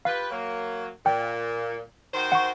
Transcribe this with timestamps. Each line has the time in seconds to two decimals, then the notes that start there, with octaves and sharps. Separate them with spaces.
0.05 F4 G4 B4 F5
0.30 F#3 A#3
1.06 A#2 G5
2.13 D#3 F#4 C5
2.32 F#5 C#6